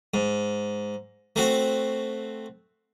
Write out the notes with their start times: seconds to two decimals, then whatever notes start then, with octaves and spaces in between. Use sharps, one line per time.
0.14 G#2
1.36 A3 C4 F#4